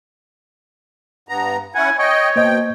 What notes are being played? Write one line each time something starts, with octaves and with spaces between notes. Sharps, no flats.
G2 B3 A#5
C#4 E4 F#5 G#5
C#5 D#5 G5
B2 A#3 C5 D#5 G5